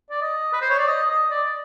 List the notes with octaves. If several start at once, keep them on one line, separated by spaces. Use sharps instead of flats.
D5
D#5
B4
C5
C#5
D5
D#5
D#5
D5